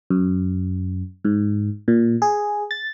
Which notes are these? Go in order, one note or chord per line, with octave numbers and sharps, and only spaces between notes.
F#2
G#2
A#2
G#4
A6